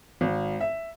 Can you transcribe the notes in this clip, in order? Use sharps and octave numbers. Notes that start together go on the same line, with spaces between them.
G#1
E5